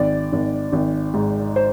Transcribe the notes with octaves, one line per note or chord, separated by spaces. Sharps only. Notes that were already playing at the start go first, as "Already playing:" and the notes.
Already playing: G#1 D5
G#1
G#1
G#2
C5